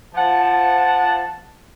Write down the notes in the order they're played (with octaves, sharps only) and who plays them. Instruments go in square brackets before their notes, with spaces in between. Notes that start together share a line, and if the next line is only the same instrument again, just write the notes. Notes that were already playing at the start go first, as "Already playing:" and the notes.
[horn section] F3 F#5 A5